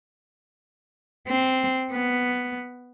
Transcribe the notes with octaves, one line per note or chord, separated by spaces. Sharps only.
C4
B3